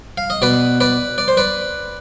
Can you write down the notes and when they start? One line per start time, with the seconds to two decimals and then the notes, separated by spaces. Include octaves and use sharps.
0.18 F5
0.30 D#5
0.42 B2 B4 D5
0.81 B4 D5
1.18 D5
1.28 C5
1.37 B4 D5